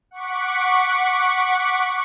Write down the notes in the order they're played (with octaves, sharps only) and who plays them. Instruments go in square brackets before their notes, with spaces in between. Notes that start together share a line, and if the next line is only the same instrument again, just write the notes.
[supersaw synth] F#5 C#6 D6 B6